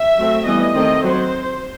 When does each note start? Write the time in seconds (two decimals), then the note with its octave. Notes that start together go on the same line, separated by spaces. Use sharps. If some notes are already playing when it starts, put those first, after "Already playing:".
Already playing: E5
0.18 F#3 A3 C4
0.46 E3 G3 B3 D#5
0.75 D#3 A3 C4 D#5
1.04 F#3 C4 C5